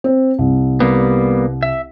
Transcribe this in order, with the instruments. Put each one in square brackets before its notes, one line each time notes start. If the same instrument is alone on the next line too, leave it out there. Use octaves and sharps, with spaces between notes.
[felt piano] C4
C2
[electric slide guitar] G3 A#3 B3
E5